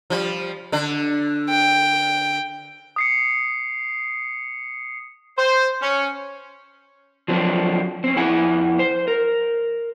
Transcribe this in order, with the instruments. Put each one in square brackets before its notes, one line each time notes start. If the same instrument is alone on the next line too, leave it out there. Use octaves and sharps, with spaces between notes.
[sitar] F3 G3
D3 D4
[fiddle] G5
[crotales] D#6 C7 C#7
[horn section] C5
C#4
[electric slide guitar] F3 F#3 C4 D4
C4 C#4
F2 E4 F#5 G#5
C5
A#4